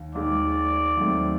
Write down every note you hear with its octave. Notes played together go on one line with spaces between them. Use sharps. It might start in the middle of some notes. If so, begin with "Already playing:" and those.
Already playing: D#2 D#3
D#2 D#3 G#3 D5
D#2 D#3 F#3 A3 C4